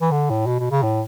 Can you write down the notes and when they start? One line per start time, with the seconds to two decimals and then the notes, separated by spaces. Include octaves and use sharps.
0.01 E3
0.11 D3
0.30 A2
0.47 B2
0.60 B2
0.71 C#3
0.83 A2